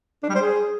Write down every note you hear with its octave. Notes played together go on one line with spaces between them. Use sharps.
D4
G3
C5
G#4